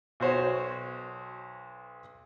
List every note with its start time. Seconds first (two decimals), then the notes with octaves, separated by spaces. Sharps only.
0.20 B1 F#4 C5 C#5